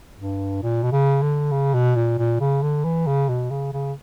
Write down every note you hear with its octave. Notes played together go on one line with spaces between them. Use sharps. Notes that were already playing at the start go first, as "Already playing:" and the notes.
G2
A#2
B2
C#3
D3
C#3
B2
A#2
A#2
C#3
D3
E3
C#3
B2
C#3
C#3